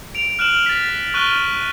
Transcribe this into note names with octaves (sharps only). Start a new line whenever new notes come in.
D7 F7
F6 F#6 D7 E7 F#7
A6 B6
C#6 F6 F#6 D#7 G7